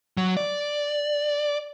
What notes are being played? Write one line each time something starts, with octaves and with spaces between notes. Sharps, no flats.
F#3
D5